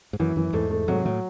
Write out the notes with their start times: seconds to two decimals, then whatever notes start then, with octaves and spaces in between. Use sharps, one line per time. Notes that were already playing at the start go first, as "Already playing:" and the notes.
0.13 G#2
0.20 F#2 E3
0.36 F#2 E3
0.53 E2 G#2 A3
0.71 A3
0.88 G#2 C3 F#3
1.05 A2 F#3